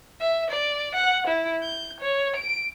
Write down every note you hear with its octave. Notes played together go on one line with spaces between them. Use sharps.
E5
D5
F#5
E4
G6
C#5
D7